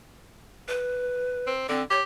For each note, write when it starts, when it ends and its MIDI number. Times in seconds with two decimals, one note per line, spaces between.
0.68 1.52 71
1.47 1.65 60
1.69 1.82 50
1.69 1.84 60
1.90 2.03 67
1.90 1.99 73